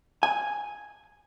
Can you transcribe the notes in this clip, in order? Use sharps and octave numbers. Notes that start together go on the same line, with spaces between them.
G#5